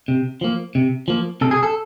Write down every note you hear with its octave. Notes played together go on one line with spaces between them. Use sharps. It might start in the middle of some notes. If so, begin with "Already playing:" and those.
C3
F3 A#3
C3
F3 A#3
C3 A4
G#4
A4